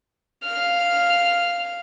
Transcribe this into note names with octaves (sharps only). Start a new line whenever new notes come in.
F5 F6